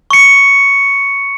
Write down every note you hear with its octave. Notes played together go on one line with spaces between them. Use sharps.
C#6 C#7